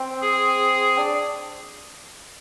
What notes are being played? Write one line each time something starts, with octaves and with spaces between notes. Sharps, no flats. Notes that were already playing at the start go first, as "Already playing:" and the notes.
Already playing: C4
G#4
D4